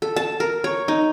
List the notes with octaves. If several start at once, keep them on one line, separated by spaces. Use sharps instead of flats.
A4
A5
A#4
C#5
D#4